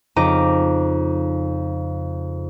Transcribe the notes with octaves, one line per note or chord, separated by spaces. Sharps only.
F2 C#3 D#4 A#5 D6 D#7